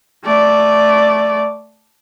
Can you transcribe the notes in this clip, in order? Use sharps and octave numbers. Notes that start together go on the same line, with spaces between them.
A3 D5